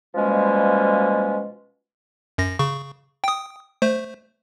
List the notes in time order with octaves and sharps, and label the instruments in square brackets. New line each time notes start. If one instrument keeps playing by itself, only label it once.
[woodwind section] B2 F3 G3 G#3 A#3 C#4
[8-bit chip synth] F#2 A#6
C#3 C#6
G5 D#6
A3 C5